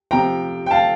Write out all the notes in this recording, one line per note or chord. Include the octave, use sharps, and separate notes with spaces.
C3 F3 G5 A#5
G5
F5 A5